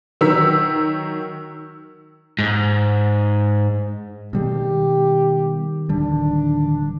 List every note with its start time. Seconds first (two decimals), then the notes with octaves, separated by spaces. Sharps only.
0.21 D#3 F#3 E6 B6
2.39 G#2
4.33 B2 D#3 G3 G#3 G4
5.89 D1 D3 G3 D4